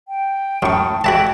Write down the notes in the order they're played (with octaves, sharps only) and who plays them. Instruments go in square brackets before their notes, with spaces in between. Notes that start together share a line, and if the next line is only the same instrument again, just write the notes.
[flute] G5
[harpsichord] F#2 C#6 [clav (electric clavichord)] A2 D#3
[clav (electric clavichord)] F2 E3 [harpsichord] F#4 E5 A5 [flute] G5